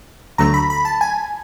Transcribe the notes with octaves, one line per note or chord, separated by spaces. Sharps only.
D2 D3 F#3 A3 A#5
B5
B5
A5
G#5